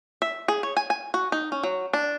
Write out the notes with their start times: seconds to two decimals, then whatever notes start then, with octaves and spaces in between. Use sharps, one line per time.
0.22 E5
0.48 G#4
0.63 C#5
0.77 G#5
0.90 G#5
1.14 F#4
1.32 D#4
1.52 C#4
1.63 F#3
1.93 D4